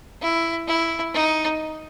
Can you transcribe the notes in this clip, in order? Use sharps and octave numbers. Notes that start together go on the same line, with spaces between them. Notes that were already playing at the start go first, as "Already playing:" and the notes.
E4
E4
D#4